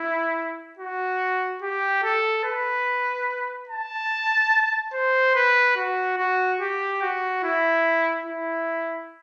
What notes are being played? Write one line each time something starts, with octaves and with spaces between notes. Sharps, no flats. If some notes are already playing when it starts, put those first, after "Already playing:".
Already playing: E4
F#4
G4
A4
B4
A5
C5
B4
F#4
F#4
G4
F#4
E4
E4